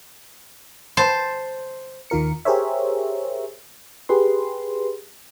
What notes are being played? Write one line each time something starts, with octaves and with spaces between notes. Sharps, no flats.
C5 A5
D#2 D#3 F4 A#4 C#7
G4 G#4 A#4 C5 C#5 E5
G4 G#4 B4 C6